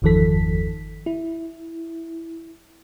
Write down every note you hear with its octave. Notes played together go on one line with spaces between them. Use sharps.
G1 E2 D#3 F3 A4 B6
E4